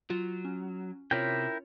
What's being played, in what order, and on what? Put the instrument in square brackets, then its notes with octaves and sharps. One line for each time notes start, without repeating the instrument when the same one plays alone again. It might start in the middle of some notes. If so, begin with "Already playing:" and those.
[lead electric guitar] F#3 [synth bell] F4
[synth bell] C#4
[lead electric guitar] C3 G4 [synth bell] C#4 F4 C#5 [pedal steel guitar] E4 A#4 G5